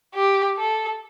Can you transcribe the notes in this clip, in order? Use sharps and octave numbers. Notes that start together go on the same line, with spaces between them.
G4
A4